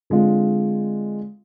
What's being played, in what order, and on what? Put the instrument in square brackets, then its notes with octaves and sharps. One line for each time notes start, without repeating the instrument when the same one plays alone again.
[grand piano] D3 G#3 C4 F4